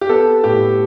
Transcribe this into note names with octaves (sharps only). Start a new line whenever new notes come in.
G4
B3 A4
A2 G4